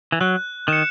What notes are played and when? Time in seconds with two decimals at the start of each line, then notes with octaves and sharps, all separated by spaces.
0.12 E3
0.21 F#3 F#6
0.68 D#3 C#7 E7